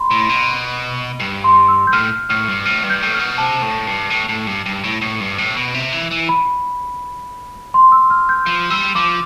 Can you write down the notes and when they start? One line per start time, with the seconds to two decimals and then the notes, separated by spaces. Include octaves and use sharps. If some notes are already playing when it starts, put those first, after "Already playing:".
Already playing: B5 C6
0.11 A2
0.29 B2
1.20 G2
1.44 C6
1.68 E6
1.87 G6
1.93 A2 F6
2.29 A2 F6
2.48 G2
2.65 A2 F6
2.83 G2
2.90 G6
3.02 A2
3.14 F6
3.19 B2
3.38 C3 A5
3.62 A2
3.87 G2
4.10 A2
4.29 A2
4.47 G2
4.66 G2
4.84 A2
5.01 A2
5.20 G2
5.38 A2
5.56 B2
5.74 C3
5.93 E3
6.11 E3
6.29 B5
7.74 C6
7.92 E6
8.10 F6
8.29 G6
8.46 F3
8.70 G3 E6
8.95 F3 D6